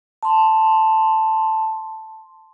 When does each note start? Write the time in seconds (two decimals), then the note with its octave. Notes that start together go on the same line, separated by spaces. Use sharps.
0.23 A5 C6